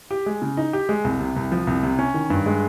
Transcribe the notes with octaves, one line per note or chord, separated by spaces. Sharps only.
G4
G#3
C#3
D#4
G4
G#3
C2
C3
C2
F3
C2
C3
C#4
D#3
G2
G#3